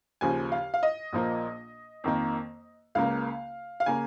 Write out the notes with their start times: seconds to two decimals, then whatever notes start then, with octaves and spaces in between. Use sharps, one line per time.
0.21 D#2 C#3 F3 G#5
0.52 F5
0.74 F5
0.83 D#5
1.13 A#1 A#2 F3 A#3
2.04 F2 D#3 A#3
2.95 C#2 C#3 A#3 F5
3.80 F5
3.86 C#3 A#3 G#5